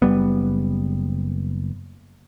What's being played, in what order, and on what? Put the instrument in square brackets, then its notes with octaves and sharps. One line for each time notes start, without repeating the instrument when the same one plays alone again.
[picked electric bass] F#1 G3 B3